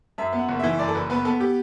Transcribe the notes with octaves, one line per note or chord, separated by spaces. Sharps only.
F#2 E5
B3
F#5
F#1
E3 E5
F#2 D5
A4
F#1 B4
B3 B4
B3 A4
G4